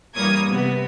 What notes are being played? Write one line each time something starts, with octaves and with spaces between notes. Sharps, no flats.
G2 E3 A#3 C#5 D#6 G#6
C3 B3